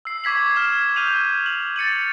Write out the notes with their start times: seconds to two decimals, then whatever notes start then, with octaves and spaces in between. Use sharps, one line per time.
0.05 E6 C7
0.24 C#6 D6 G#6 B6 F#7
0.56 F6 E7
0.96 E6 F6 G6 D#7 F7 F#7
1.46 F#7
1.76 A6 C#7 D#7 F#7